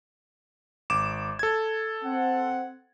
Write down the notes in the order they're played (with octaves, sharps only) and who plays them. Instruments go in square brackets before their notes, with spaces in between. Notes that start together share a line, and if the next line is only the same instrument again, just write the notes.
[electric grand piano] G#1 D6 E7
A4 G#6
[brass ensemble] C4 F#5